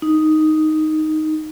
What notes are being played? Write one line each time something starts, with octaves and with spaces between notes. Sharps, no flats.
D#4